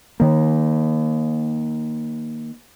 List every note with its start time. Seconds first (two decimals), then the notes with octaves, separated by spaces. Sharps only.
0.20 D#3 A#3